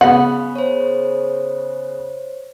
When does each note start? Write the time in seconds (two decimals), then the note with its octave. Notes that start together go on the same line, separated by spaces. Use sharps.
0.01 C#3 B3 F5 F#5 B5
0.56 C5 C#5